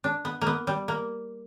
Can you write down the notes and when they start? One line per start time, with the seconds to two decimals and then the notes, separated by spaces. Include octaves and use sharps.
0.04 D4
0.25 B3
0.41 A#3
0.47 B3
0.67 G3
0.88 A#3